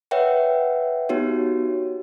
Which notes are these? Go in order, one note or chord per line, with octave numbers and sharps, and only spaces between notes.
B4 C#5 E5 F#5 G5
B3 D#4 F#4 G4 C#5